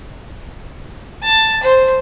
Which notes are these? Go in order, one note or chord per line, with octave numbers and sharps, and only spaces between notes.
A5
C5